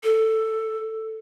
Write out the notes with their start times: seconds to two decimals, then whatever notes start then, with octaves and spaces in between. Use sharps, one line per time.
0.04 A4